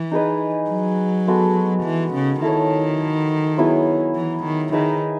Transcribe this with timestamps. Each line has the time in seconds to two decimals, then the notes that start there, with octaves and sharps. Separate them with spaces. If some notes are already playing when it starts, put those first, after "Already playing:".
Already playing: E3
0.11 D#4 G#4 B4 D#5
0.70 F#3
1.27 G#3 B3 F#4 A4
1.85 E3
2.13 C#3
2.42 D#3 E4 A4 C#5
3.57 F#3 B3 E4 G#4
4.15 E3
4.44 D#3
4.72 D#3 D#4 G#4 B4 E5